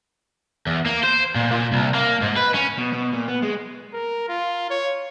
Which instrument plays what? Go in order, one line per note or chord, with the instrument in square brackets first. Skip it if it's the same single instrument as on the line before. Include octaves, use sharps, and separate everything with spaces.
[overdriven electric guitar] E2
A#3
C5
A#2
A#2
C2
A#3
G#2
B4
C#4
B2
B2
A#2
B3
G#3
[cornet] A#4
F4
C#5